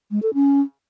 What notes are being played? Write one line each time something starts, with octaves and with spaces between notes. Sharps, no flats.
G#3
A4
C#4